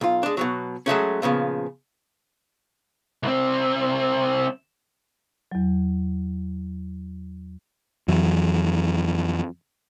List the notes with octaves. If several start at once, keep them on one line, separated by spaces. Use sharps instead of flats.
B1 F4
G#3 D4
B2 E3 F#3
F#3 G#3 A3 C#4
A#2 C#3 F3 B3
C2 C4
E2 F#3
F2 E3 F#3